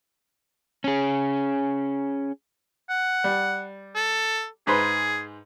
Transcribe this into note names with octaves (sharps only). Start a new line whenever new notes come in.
C#4 G#4
F#5
G3
A4
G#2 G#4 B4 C5